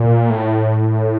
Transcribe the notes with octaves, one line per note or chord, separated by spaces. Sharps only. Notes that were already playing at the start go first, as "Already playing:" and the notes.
Already playing: A#2
A2